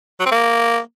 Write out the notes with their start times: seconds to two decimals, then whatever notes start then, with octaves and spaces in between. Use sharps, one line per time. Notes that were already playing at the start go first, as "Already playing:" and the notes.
0.20 F#3
0.26 C4
0.31 A#3